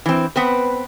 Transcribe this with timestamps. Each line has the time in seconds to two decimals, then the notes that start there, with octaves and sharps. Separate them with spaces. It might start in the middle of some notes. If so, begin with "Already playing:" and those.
0.06 E3 C4
0.36 B3 C4 B4